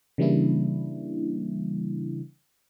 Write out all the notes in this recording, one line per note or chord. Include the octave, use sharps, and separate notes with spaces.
C#3 E3 G3 A#3 D4 E4